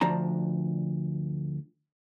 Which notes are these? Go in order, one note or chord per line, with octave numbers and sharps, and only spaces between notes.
D2 F3 D4 A#5